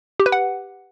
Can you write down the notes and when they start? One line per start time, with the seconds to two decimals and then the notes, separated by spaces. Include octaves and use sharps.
0.20 G4
0.26 B4
0.32 F#5